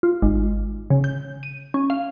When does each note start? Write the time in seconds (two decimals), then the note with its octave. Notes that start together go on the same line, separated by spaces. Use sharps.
0.03 F4
0.22 G#1
0.90 C#3
1.04 G6
1.43 D#7
1.74 C#4
1.90 F5